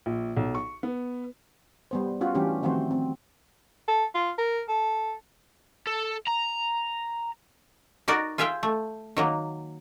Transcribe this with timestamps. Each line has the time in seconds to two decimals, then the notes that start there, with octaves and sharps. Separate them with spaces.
0.06 A#1
0.37 B1
0.55 C#6
0.83 B3
1.91 G3 B3 C5
2.21 C#4 F4 F#4
2.35 E3 G3 A3 C#4 D4 G4
2.63 D#3 F3 A3 C4 F#4 C5
2.91 C4
3.88 A4
4.15 F4
4.38 A#4
4.69 A4
5.87 A4
6.28 A#5
8.08 D#4 F#4 A#4 D5
8.38 F4 G#4 E5 F5 G5 G#5
8.63 A3
9.17 D#3 F#3 A#3